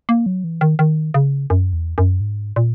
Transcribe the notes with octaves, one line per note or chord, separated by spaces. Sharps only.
A#3
F#3
E3
D#3
D#3
C#3
F#2
E2
F#2
G#2
A#2